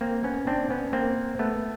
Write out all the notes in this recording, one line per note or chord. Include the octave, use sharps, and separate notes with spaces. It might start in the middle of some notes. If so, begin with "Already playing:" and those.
A#3 C4
B3 C#4
C4 D4
B3 C#4
A#3 C4
A3 B3